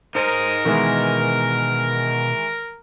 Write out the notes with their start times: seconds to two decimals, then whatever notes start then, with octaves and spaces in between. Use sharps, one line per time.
0.15 D#4 G#4 A#4 C5 D#5
0.65 B2 D#3 E3 G#3